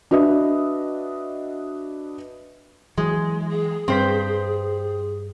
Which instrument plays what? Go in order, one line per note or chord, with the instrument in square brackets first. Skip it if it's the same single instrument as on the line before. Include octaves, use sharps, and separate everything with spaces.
[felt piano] D4 F#4 B4 D#5 E5
[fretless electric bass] E3 F#3 [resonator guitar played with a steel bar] G#3
[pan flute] G#4
[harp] G2 B6 [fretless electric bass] G3 [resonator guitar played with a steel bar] C4 C5